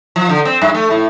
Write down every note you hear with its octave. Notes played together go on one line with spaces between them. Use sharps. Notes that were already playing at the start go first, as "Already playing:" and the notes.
F3
D3
C4
G2
A3
A2